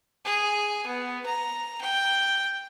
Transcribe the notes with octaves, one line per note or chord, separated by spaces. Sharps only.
G#4
B3
A#5
G5